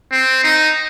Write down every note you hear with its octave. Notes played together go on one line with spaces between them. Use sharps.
C4
D#4